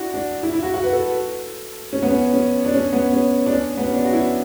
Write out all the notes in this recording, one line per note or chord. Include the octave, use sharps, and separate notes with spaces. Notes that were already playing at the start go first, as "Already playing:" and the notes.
Already playing: D4 E4 F#4
D4
E4
E4
F#4
F#4
B4
A4
C#4
B3
C#4
C#4
D4
C#4
B3
C#4
D4
C#4
B3
C#4
D4
F#4
E4